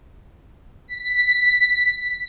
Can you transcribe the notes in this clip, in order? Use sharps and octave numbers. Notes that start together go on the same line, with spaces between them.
B6